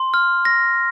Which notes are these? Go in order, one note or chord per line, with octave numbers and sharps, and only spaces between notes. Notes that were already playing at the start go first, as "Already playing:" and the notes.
Already playing: C6
F6
A#6